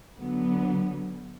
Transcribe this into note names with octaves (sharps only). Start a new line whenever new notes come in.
D3 F#3 B3